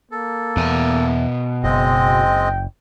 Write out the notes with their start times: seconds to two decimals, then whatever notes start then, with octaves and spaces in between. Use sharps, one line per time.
0.11 A#3 A4
0.57 E2 B2 G#5
1.64 F#1 G#3 C4 D#5 G5